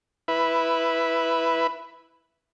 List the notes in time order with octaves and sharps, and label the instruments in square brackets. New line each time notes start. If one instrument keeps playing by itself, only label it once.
[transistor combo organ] E4 B4